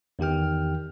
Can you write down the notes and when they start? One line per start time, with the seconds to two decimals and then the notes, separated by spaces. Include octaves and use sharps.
0.19 E2 D#3 G4 G5 F6